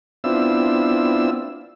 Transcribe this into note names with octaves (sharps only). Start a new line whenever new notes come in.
B3 C4 D4 E4 F4 E6